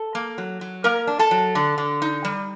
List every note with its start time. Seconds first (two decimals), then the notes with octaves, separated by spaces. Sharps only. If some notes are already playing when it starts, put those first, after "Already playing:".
Already playing: A4 A5
0.15 A#3
0.38 F#3
0.61 F#3
0.84 A#3 A#4 A#5
1.07 D4
1.19 A4 A5
1.31 F#3
1.55 D3
1.78 D3
2.02 D#4
2.25 G3